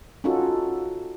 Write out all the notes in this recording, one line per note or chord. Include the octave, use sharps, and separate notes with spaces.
C#4 D#4 F4 F#4 A4